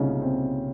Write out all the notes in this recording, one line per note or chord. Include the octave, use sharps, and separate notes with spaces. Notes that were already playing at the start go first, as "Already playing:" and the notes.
Already playing: C2 A#2 C#3 C#4 D#4
C4